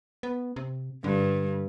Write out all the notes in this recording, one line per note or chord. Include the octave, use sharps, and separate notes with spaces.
B3
C3
G2 D3